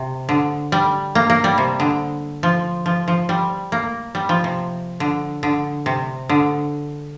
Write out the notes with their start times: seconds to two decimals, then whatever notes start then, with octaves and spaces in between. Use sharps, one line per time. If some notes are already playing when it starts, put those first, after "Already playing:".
Already playing: C3
0.29 D3
0.72 G3
1.15 A#3
1.30 A#3
1.44 G3
1.58 C3
1.80 D3
2.43 F3
2.86 F3
3.08 F3
3.29 G3
3.72 A#3
4.15 G3
4.29 F3
4.44 C3
5.00 D3
5.43 D3
5.86 C3
6.29 D3